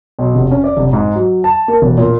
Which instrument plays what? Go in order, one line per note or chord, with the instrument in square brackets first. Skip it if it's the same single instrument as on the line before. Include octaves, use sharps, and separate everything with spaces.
[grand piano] B1
F1
C#4
D5
F1
G#2
F#3
A5
A#3
E1
A#2